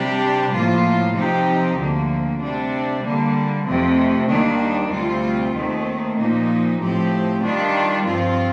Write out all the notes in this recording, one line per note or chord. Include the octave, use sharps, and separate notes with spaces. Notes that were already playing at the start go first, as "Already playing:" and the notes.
Already playing: C3 G3 D4 G4
A2 F3 A#3 F4
C3 F3 C4 D#4 G4
D2 D3 F3 A#3
C3 G3 D4
D3 G3 A#3
F2 C3 F3 A3
D#2 D#3 G3 A#3 D4
D2 C3 G3 C4 F4
D#2 D#3 A3 C4
A#2 F3 A#3 D#4
A2 F3 C4 G4
D#3 G3 D4 F4
G2 F3 C4 F4